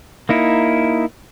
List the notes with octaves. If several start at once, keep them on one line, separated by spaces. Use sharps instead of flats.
A#3 D#4 E4